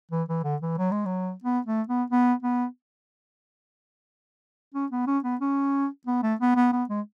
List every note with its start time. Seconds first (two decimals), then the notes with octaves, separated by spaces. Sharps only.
0.11 E3
0.29 E3
0.44 D3
0.61 E3
0.78 F#3
0.91 G#3
1.05 F#3
1.43 B3
1.66 A3
1.88 B3
2.10 B3
2.42 B3
4.74 C#4
4.92 B3
5.07 C#4
5.24 B3
5.41 C#4
6.06 B3
6.23 A3
6.40 B3
6.56 B3
6.72 B3
6.89 G#3